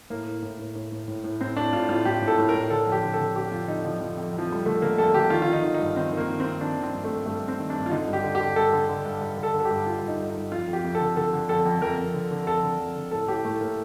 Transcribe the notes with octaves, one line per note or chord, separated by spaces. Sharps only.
A2 A#3
A2
A2
A2
A2
A2
A2
A2
A2 C4
A2 D4
A2 F4
A2 F4
A2 G4
A2
A4
A2
A#4
A2
D3 A4
F2 G4
D3
A4
D3
D3 G4
F2 F4
D3 D#4
D3 F3
F2 F3
F2
F2
F3
F2 G3
D3 A3
D3 A#3
F2 A4
D3 G4
D#3 F4
F4
D#3
D#4
D#3
D#4
G2
D#3 C4
D#3
A#3
D#3
C4
D#3
D#3 D4
D#3
C4
G2
A3
G2
G2 A3
G2
C4
D#3
G2 D4
F4
D3 D#4
G2
G4
D3
G4
D3
G2 A4
D3
D3
G2
G2
D3
A4
D3
A4
G4
G2
G2 F4
G2
D#4
G2
D#4
G2
F2 F4
F2
G4
F2
A4
D3
D3 A4
D3
F2 A4
F2
F2 A#4
F2
D3
D3
F2 A4
D3
F2
D3
A2 A4
A2 G4
A2 A3
A2 A#3